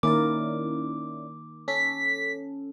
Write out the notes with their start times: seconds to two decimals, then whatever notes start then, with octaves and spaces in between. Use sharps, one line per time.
0.03 D#3 A#3 C#4 E4 A#4 D5 D6
1.68 C#4 A4 B6